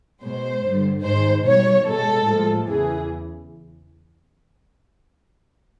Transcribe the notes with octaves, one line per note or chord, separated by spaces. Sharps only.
B2 G#3 C5
G2 D3 G3
G#2 D#3 G#3 C5
B2 G3 C#5
B2 G#3 A4
A2 F3 G#3
E2 C#3 E3 G#4